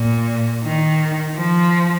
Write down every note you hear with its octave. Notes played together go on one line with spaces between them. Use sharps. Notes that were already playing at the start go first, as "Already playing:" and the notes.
Already playing: A#2
D#3
F3